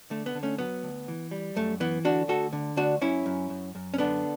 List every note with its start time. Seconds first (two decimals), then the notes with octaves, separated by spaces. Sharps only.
0.10 D3 A3
0.26 B3
0.35 D3
0.43 A3 C#4
0.58 F#3 B3
0.83 D2
1.08 E3
1.31 G3
1.56 F#2 A3
1.80 E3 B3
2.05 D3 D4 F#4
2.28 D2 F#4 A4
2.53 D3
2.76 D2 D4 F#4
3.01 F#2 C#4 E4
3.26 F#2
3.50 F#2
3.75 F#2
3.94 C#4
3.98 D3 B3 D4